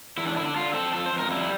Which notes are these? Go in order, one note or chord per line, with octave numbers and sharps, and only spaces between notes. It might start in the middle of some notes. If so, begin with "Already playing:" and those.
E2 E4
D4
D3 E4
D4
D3 F4
C4 A4
F2 A4
C5
F2
A#4
G3 E4